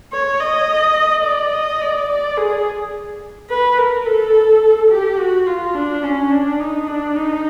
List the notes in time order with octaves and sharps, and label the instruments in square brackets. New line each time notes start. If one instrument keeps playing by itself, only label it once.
[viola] C#5
D#5
D5
D#5
D5
D5
G#4
B4
A#4
A4
G4
F#4
F4
D4
C#4
D4
D#4
D4
D#4